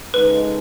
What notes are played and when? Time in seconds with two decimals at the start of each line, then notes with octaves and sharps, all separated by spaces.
0.14 C#3 G#3 D#4 A4 B4